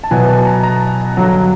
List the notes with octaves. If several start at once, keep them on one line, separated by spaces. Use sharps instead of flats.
A5
B2 F#3 B3 E4 G#5
A5
A#5
A#5
G2 D3 F#3